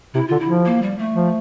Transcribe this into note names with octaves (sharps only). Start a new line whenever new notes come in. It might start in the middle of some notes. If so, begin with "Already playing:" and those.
C3 E4
D3 F4
E4
F3
A#3
G3
A3
F3